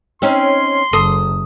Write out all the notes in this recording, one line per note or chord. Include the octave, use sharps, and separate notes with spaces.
C4 C#4 D#4 C6
F#1 A4 D#6